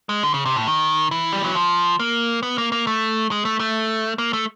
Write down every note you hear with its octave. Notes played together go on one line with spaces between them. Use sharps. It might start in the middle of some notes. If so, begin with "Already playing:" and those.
G#3
D3
C#3
C3
A2
D#3
E3
G3
F#3
F3
A#3
B3
A#3
A#3
A3
G#3
A3
A3
A#3
A3